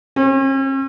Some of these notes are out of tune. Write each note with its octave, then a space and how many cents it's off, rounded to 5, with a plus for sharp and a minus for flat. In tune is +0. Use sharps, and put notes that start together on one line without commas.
C#4 -45